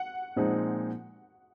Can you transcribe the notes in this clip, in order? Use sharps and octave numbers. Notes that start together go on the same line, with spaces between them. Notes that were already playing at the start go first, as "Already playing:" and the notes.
Already playing: F#5
A#2 F3 G#3 C4 D#4